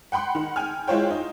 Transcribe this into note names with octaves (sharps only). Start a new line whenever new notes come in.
F#5 G5 B5 C6
D#3 F#5
G5 G#5 F6
G#3 E4 F4 C5 C#5 G5
D#4